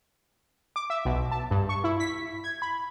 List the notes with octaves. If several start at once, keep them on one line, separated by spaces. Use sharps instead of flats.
D6
E5
B1
A5
G2
C#6
E4
B6
G#6
B5